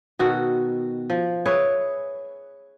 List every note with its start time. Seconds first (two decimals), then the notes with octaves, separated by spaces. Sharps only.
0.19 B2 D#3 F#4 A4
1.10 F3
1.45 G#4 B4 C#5 E5